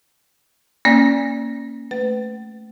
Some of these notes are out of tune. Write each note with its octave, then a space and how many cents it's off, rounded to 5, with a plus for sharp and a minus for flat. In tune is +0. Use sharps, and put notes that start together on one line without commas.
A#3 +0 C#4 +0 D5 -5
A3 +0 B4 +30